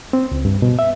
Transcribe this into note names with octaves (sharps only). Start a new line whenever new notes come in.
C4
C#2
G2
B2
E5